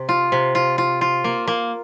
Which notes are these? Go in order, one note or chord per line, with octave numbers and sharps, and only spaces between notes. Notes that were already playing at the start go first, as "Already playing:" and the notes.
Already playing: C3
F4
C3
F4
F4
F4
A#3
A#3